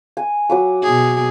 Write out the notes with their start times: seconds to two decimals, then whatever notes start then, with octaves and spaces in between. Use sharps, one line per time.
0.17 G#5
0.50 F#3 D6 D#6
0.83 B2 G#4